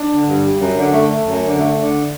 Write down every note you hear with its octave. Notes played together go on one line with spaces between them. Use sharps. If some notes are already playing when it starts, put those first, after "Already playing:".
Already playing: D4
D3
G2
G3
F#2
D3
A3
A3
F#2
D3
A3
D3